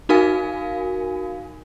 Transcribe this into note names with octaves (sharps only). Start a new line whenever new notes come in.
D#4 F#4 A#4 F5 G#5